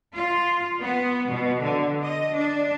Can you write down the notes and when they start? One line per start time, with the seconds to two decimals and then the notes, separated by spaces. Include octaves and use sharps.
0.14 F4
0.81 B3
1.30 B2
1.61 D3
2.03 D#5
2.36 D4